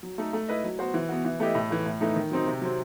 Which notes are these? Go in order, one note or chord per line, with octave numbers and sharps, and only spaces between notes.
F#3
A3 D#4 A4
A3
E4 B4 D#5
F#3
B3 F#4 C5
E3
B3 F#4
E3
A3 E4 G4 D#5
A2
E3 A3
A2
E3 A3 D#4
D#3
F#3 C4 D#4
C3
F#3 C4